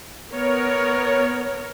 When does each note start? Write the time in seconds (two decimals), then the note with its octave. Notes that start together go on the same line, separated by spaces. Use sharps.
0.34 B3 A#4 C#5